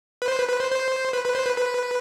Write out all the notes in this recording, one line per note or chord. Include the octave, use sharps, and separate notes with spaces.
B4
C5
B4
B4
C5
C5
B4
B4
C5
B4
B4